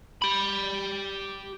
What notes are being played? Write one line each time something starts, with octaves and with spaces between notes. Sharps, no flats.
G4 B5